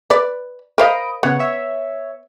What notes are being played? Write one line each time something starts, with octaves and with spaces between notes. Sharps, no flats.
B4 D5
A#4 C5 D#5 F5 B5 D7
C#3 B3 C#5 F#5
C#5 E5